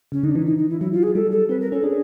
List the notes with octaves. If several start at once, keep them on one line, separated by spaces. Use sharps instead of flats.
C#3 C#4
D3 D#4
D4
E3 D#4
D#4
D#4
E4
F#3 E4
F4
G#4
G3 A4
A4
C4 B4
A#4
C#4 A4
D4 G#4